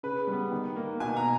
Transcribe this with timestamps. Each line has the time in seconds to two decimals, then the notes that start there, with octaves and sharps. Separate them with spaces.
0.03 C#3 B4
0.27 G3 B3
0.51 D#3
0.76 A#3
1.00 B2 G#5
1.17 A#5